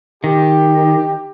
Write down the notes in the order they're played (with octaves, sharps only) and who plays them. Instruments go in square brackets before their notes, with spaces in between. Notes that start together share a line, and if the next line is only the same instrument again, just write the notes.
[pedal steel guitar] D#3 [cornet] G4